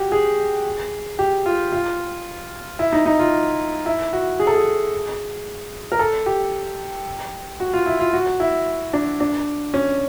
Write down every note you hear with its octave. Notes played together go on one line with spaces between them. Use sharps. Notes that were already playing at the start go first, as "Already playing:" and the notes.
Already playing: F#4 G4
G#4
G4
F4
F4
E4
D#4
D#4
F4
E4
F#4
G#4
A4
G#4
A#4
A4
G4
F#4
F4
E4
F4
F#4
E4
D4
D4
C#4